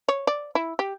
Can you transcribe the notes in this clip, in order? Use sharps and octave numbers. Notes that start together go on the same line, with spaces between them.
C#5
D5
E4
G4